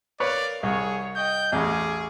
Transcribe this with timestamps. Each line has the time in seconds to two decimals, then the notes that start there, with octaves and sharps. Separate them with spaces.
0.20 A#4 B4 C#5 D5 F5
0.63 C2 G#4 C#5 C#6
1.16 D#5 G5 G6
1.52 A1 E2 G#4 C#6 D6